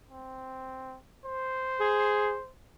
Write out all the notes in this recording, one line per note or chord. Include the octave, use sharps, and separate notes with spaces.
C4
C5
G#4